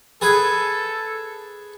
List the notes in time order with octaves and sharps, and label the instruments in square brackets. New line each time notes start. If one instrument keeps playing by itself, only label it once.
[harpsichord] G#4 B4 G#5 [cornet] A4